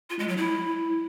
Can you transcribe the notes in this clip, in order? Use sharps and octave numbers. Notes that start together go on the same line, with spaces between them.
F4
G#3
F#3
E4